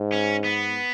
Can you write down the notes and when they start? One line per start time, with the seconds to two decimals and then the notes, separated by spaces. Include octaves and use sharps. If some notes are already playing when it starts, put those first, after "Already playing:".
Already playing: G#2
0.12 C#4
0.44 B3